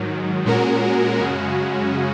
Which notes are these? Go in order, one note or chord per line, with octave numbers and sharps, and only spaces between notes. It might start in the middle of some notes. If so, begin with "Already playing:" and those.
Already playing: G#2 D#3 F#3
A#2 G#3 C#4 F#4 A#4
F#2 C#3 G#3 C#4 F#4